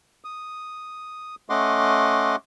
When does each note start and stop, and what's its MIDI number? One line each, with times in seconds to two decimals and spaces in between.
0.24 1.35 87
1.50 2.36 57
1.50 2.36 61
1.50 2.36 75
1.50 2.36 78
1.50 2.36 84
1.50 2.36 86